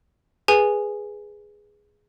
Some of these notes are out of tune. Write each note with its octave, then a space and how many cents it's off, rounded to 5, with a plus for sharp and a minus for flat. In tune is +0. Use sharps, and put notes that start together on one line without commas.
G#4 +0 B4 +0 G#5 +0